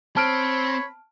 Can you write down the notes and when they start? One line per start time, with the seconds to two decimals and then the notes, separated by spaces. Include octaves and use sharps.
0.17 C4 C#5 A5 B5 F6 D7